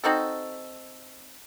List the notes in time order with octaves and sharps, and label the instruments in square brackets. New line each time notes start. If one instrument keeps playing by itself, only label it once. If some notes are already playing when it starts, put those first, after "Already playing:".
[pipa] C4 D#4 F#4 A4